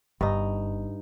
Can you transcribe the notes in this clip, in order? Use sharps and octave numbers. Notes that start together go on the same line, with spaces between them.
G1 G2 D#4